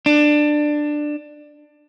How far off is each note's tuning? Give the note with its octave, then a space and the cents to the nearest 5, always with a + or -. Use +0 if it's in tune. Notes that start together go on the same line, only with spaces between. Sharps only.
D4 +15